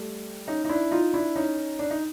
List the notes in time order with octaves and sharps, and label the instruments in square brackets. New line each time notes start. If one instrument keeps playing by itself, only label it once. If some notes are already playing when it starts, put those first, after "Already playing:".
Already playing: [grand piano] G3 A3
C#4 D#4
D#4
D4 E4
D#4 F4
D4 E4
C#4 D#4
D4
D#4